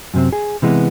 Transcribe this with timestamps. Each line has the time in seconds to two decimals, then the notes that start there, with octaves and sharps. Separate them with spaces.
0.14 F#2 C3 C4
0.33 G#4
0.62 C3 E3 G#3 B3